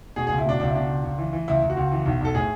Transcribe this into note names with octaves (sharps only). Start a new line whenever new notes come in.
B2 G#4
G#4
C#2
E4
B2 D4
C#2 D4
E4
B2 D4
C#2
C#2
E3
E3
C#2 E4
C#2
F#4
C#2
E3
B1
B1 A4
A2 G#4